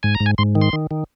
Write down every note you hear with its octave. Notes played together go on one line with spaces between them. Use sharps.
G#2 G#5
A#5
G#2
G#5
G#2 C6
D#3
C6
D#3
D#3